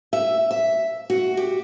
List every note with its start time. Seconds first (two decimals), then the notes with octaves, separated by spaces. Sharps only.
0.13 E5
0.51 E5
1.10 F#4
1.37 G4